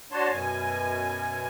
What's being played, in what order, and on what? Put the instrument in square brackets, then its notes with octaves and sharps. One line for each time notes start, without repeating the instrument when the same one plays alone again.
[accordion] D4 F#4 C#5 A5 C6
F#2 B2 G#5